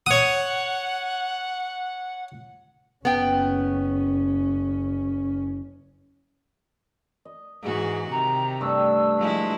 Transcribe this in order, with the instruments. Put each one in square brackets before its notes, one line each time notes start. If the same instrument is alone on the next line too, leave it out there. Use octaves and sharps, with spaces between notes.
[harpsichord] C#5 D#6 [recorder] F#5
[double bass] F#1 C#4 [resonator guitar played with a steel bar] B3 G5
[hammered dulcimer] D#5
[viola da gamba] G#2 E3 F#4 [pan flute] G#4
[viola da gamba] C3 D#3 [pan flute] A#5
[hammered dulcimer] G2 A3 [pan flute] E6
[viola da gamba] F3 G#3 E4